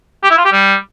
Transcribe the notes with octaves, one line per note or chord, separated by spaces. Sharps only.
G4
E4
F4
G4
G3